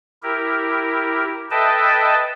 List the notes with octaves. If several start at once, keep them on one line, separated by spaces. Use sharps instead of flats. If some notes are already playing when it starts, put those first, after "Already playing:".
E4 G4 A#4
A4 B4 D#5 E5 G5 A5